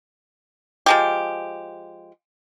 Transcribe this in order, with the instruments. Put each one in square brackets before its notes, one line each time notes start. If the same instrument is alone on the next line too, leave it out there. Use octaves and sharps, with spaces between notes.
[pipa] F3 G#3 G4